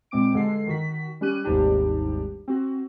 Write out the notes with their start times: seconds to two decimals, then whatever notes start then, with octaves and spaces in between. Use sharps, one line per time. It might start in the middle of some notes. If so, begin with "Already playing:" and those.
0.11 A#2 G#3 C4 D6 D7
0.33 G2 D3 G#3 A4 C7
0.67 D#3 F#4 B6
1.21 G3 C#4 G4 F#6 D#7
1.44 G#1 D#2 G#2 G3 D4 G4
2.48 C4 F#4